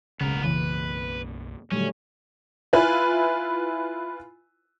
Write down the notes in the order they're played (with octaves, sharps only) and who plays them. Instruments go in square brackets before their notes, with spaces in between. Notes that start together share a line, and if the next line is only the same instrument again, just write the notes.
[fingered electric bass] D1 B1 G#3 [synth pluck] C#3 [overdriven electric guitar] B3 A#4
[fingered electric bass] B1 F#2 A#3 [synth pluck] C#3 E3 [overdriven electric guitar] B4
[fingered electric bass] A#2 D3 D#3 [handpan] F#3 G3 A3 [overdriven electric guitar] C#4
[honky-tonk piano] E4 F4 B4 G#5